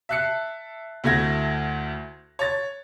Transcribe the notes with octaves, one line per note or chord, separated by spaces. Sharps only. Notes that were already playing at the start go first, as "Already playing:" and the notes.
E5 A5 F#6 C7 C#7
D2 A3 E4 G#6 A#6
C#5 A6